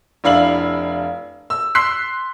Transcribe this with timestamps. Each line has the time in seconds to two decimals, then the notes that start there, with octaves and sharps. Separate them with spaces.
0.24 F1 D4 E4 F5 F#7
1.50 E6
1.75 C6 E6 F#6 B6 C7